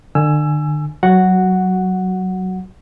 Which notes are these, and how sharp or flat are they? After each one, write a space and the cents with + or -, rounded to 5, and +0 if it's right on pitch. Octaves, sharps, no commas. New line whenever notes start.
D3 +40 G#5 +5 E6 +20
F#3 +15 F#4 +0 F#5 +0